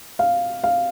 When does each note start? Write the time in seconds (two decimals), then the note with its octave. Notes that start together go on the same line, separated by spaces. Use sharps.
0.19 F5
0.64 F5